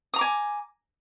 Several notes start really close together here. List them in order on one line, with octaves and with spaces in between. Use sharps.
D#6 A#5 D6 G#5